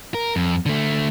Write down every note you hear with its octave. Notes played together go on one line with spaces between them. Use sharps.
A#4
F2
D3 A3